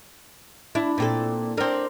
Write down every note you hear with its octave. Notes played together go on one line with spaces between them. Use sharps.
D4 E4
A#2 C4 A4
C4 D4 A#4 C5